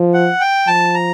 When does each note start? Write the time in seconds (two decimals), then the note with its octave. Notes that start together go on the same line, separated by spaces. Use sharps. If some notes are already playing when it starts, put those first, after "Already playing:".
Already playing: F3
0.14 F#5
0.40 G5
0.67 F3 A5
0.94 A#5